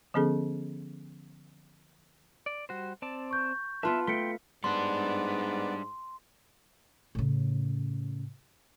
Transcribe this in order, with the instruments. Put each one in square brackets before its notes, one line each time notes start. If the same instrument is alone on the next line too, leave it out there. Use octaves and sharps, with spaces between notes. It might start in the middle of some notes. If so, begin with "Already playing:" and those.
[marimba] D3 F3 B3 C#4 G#4 A4
[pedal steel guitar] D5
G3 F#4 C5
C4 D5 A5
[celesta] C#6 G6
[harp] B3 F4 B4 [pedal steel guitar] E5 [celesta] A5 C6
[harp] A3 [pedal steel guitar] G5 C6 [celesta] B6 C#7
[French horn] G#2 [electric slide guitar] G3 D4 [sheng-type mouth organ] B3 D5 [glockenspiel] C6
[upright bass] A2 C#3